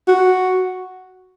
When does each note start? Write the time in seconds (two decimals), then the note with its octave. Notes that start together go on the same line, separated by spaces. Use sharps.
0.08 F#4